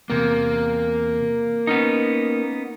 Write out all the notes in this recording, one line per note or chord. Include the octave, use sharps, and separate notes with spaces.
E2 C3 A#3
B3 C#4 D#4